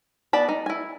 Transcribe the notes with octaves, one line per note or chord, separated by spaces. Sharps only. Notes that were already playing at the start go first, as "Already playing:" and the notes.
B3 D5 A5 B5
D#4
E4 G#5